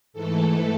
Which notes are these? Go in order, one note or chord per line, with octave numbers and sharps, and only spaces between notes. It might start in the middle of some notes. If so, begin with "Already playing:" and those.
G#2 E3 A3 A4